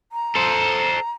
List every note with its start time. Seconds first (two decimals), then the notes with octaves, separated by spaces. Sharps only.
0.12 A#5
0.35 A4 C5